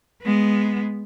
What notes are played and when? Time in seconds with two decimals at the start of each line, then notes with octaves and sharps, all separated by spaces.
0.23 G#3 B3